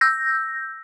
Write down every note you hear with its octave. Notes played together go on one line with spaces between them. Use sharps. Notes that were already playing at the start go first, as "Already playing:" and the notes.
E6 G6 A#6